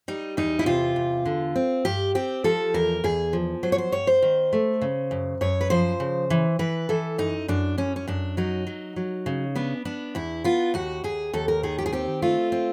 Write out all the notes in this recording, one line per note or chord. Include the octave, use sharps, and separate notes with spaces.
G3 D#4
E2 D#4
E4
C3 F4
E2
D3
C4
G2 G4
C4 G4
F3 A4
E2 A#4
E2 G#4
F3
F#3 C5
C#5
C5
G2 C#5
C5
D#3
A3
C#3
F#2
F#2 C#5
B4
F3 C5
C#3
E3
E3 B4
E3 A4
F#2 D#4
F#2 D4
F#2 C#4
C#4
F#2 D4
F#3 D#4
F#3
F#3
C#3
B3 D4
B3 D4
E2 E4
B3 F4
D#2 F#4
D#2 G#4
D#2 A4
A#4
D#3 G#4
G4
G#4
C4 G4
A3 F4
C4